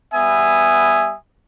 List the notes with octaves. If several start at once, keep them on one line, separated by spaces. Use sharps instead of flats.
G3 B3 E5 G#5 D#6